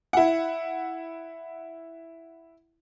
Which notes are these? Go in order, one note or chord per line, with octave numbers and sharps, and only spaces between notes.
E4 F#5